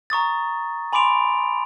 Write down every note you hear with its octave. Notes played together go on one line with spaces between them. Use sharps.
A#5 C#6 D#6 A6
G#5 B5 C6 D6 D7 F7